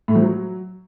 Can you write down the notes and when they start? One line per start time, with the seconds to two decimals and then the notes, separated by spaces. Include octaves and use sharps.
0.08 A2
0.15 F3
0.22 F#3